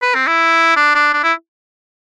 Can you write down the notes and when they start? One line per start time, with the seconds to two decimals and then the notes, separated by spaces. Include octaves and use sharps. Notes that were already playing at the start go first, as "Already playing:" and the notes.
0.02 B4
0.14 C4
0.27 E4
0.76 D4
0.95 D4
1.14 D4
1.23 E4